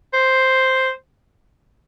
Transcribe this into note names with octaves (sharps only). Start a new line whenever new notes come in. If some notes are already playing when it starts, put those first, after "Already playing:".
C5